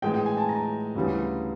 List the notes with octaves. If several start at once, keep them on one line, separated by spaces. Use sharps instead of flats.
A2 E3 G#3 G5
G5
G#5
A5
A#5
D2 C#3 E3 G3